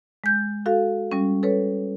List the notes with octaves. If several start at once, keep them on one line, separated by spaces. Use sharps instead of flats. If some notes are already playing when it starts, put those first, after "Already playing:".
G#3 G6
F#4 A4 F5
G3 C#4
A4 B4 C#5